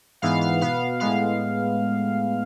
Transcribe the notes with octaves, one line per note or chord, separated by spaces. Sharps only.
G#2 E3 B3 F5
F5
B2 B3 F5
A2 G#3 B3 F5